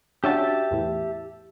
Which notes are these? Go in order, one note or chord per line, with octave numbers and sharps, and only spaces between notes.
C#4 D4 F#4 G4 E5 A5
E2 A2 E3